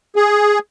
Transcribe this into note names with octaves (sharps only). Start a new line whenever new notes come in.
G#4